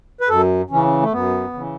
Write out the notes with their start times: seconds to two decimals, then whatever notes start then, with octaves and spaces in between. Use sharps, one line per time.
0.21 B4
0.29 F#2 A4
0.70 C#3 E3 C#4
1.02 A3
1.12 F#2 B3
1.53 C#3 E3